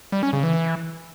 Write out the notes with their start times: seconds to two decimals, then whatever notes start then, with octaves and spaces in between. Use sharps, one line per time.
0.12 G3
0.23 C#4
0.33 C#3
0.43 E3
0.53 E3